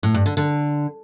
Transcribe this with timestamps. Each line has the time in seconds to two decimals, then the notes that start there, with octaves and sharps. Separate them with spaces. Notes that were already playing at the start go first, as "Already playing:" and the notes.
0.03 A2
0.14 G2
0.26 D3
0.37 D3